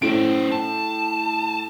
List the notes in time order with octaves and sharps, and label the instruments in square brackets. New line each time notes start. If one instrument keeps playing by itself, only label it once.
[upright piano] A2 D7 [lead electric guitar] C#4 C5
[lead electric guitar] A5